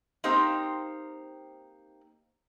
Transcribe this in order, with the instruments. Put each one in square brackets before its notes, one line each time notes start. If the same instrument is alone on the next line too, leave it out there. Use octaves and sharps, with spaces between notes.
[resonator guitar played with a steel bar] A#3 C4 D#4 G4 C5